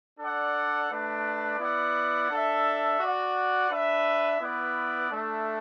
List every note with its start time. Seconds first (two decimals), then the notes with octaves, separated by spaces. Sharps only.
0.19 D4 A4 D5 F#5
0.89 A3 D4 B4 D5
1.59 B3 E4 D5 F#5
2.30 D4 A4 E5
3.00 F#4 D5 F#5
3.70 D4 B4 E5
4.41 B3 E4 B4 D5
5.10 A3 D4 A4 E5